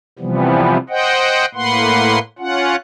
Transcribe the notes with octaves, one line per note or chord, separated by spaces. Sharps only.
C3 E3 F3 G3 B3
C5 D#5 F#5 G5
A2 A#3 B4 F#5 C6
C#4 F4 F#5